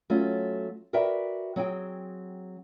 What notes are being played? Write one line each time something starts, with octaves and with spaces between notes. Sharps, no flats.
F#3 A3 C#4 F4
F#4 A#4 B4 D5 E5 G5
F#3 C4 G#4 G5